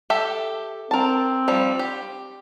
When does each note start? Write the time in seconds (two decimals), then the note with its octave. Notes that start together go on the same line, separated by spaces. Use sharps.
0.10 G4 A4 E5
0.91 C4 A#4 A5
1.48 F3 G3
1.79 G4